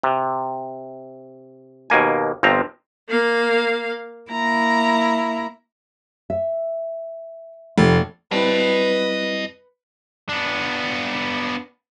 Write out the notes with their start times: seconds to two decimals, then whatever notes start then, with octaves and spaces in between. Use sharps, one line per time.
0.03 C3
1.90 D#2 B2 A#3 G#5
2.43 G1 F3 C4 A#5
3.09 A#3 F5
4.31 A#3 E4 A#5
6.30 E5
7.78 F1 C3 A3 F4
8.32 G3 C4 E4 B4 D#5 A5
10.29 B3 D4